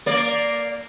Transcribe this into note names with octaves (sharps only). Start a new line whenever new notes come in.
A#3 D5